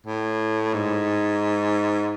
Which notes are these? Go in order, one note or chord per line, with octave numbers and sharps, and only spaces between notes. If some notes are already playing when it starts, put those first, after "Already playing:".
A2
G#2